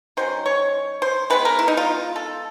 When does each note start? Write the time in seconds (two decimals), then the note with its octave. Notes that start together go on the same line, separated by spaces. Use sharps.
0.17 D#3 F#3 C#4 C5
0.46 C#5
1.02 C5
1.30 D#3 G#3 B3 B4
1.45 A#4
1.59 E4
1.68 D#4
1.77 F4
2.16 A4